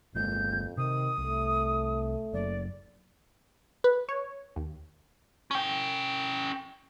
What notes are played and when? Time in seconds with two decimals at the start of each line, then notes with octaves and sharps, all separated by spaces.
0.15 G1 F2 G#3 A#3 G6
0.77 C3 D#3 D#6
1.18 C2 A3
2.33 F#1 F#2 D5
3.84 B4
4.09 C#5
4.56 D#2
5.51 C#4 G5